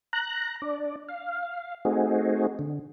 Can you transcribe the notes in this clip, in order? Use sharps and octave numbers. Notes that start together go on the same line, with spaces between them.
A#5 F#6
D4 D5
F5
A3 C4 D#4 F#4 G#4
D3